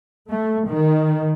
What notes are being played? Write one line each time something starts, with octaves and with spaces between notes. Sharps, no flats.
A3
D#3